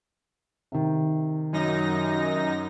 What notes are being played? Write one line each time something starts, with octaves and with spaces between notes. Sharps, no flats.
C3 D#3
F#2 D#4 A#6